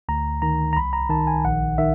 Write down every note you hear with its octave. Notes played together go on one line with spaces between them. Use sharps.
D2 A#5
D#3 A#5
A#5
C2 B5
A#5
D#3 A5
G#5
A#1 F#5
D#3 E5